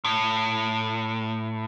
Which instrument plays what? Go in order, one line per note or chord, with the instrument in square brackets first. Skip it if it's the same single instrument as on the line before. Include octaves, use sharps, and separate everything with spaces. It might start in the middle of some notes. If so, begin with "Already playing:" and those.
[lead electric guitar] A2